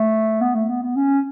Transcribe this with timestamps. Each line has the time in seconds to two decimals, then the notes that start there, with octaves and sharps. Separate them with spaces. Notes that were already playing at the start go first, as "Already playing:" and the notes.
Already playing: A3
0.41 B3
0.55 A3
0.69 B3
0.83 B3
0.96 C#4